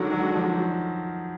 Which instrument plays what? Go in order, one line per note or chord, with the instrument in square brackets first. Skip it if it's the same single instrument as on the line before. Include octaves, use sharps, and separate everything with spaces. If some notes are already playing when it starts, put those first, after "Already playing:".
Already playing: [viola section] D3 G#3 D4 F#4 [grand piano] D#3 F#3
[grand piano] F#3
F3